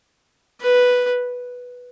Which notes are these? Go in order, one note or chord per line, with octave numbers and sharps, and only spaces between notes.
B4